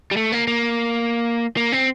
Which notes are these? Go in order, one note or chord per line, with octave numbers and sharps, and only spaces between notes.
G3
A3
A#3
A#3
A#3
C4